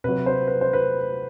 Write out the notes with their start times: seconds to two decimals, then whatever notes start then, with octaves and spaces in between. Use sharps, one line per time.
0.04 C3 F#3 B4
0.26 C5
0.47 B4
0.61 C5
0.73 B4